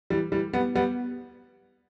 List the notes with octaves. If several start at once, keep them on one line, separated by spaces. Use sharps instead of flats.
E3 G3
E3 G3
G3 B3
G3 B3